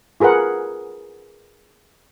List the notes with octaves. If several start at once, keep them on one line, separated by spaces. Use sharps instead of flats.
F4 G#4 A#4 B4 F#5